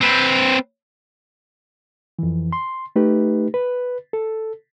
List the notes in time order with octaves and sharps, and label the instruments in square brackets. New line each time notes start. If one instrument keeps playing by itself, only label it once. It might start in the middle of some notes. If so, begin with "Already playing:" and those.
[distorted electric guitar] C4 B4
[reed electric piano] F2 E3
C6
A3 D#4 G4 B4
B4
A4